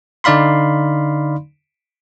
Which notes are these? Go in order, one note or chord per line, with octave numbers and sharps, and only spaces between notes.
D3 D#4 D5 F5 B5 C6